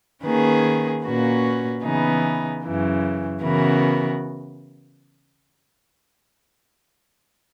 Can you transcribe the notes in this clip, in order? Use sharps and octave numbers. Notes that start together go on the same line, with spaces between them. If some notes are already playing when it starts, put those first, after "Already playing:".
D#3 A#3 C#4 G#4 B4
A#2 A#3 C#4 F#4 B4
C#3 E3 B3 D#4 G#4
F#2 C#3 E3
C#3 E3 B3 F#4 A#4